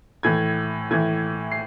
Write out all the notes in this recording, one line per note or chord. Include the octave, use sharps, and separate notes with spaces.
A2 E3 G#6
A2 E3 G#6
C7